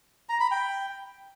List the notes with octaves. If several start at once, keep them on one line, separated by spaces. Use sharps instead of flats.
A#5
B5
G5